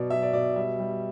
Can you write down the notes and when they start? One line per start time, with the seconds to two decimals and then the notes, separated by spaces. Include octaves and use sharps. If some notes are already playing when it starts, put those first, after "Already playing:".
Already playing: B2 F#3 D5
0.10 F#3 E5
0.22 D5
0.33 B2 D5
0.56 G3 E5
0.79 G3